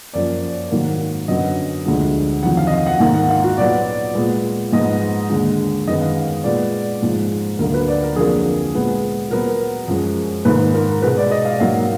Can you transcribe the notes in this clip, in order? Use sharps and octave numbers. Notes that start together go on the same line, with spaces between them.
F#2 F3 A#3 D5
G#2 D#3 F#3 A#3
F#2 D3 F#3 B3 D#5
D2 D3 F3 G#3
F2 D#3 F#3 F#5
F5
D#5
F5
F#5
G#2 D#3 A#3 F5
F#5
F5
F#4
A#2 F#3 B3 D5
A#2 G#3 B3
G#2 F3 G#3 B3 D#5
D#2 D3 G#3
F#2 D#3 G#3 B3 D#5
F5
F5
A#2 G#3 B3 D5
G#2 F3 G#3
D2 D3 F#3 A#3 A#4
B4
D5
A#4
F2 D3 F#3 A#3 G#4
A#2 G#3 B3
A#2 F#3 B3 A#4
F#2 F3 G#3
G#2 D#3 A#3 B4
A#4
B2 G#3 B3 B4
D5
D#5
F5
G#2 F#3 A#3 F5